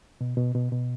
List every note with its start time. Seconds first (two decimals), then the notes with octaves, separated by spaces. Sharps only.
0.21 B2
0.37 B2
0.55 B2
0.72 B2